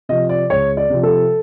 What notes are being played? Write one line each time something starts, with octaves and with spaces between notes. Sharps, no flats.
C3 F3 D#5
D5
C#2 C#5
D5
C3 F3
A4